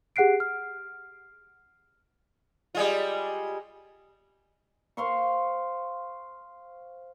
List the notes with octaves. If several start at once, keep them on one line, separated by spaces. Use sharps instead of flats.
G4 G#4 F#5 F#6 C7 D7
F6
G3 G#3 F4
C5 F5 C6 C#6